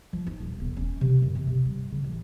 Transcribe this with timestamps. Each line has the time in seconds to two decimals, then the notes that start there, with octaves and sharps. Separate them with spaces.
0.13 F3
0.27 D#4
0.40 D#1
0.60 E1
0.77 C#4
1.01 C3
1.22 F#2
1.35 C3
1.47 C3
1.65 G2
1.92 C#3
2.04 A1